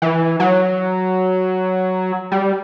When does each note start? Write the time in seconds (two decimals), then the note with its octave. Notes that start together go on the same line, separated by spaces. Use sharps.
0.02 E3
0.40 F#3
2.32 G3